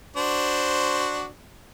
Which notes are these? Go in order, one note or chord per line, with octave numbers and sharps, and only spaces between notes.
D4 F#4 C5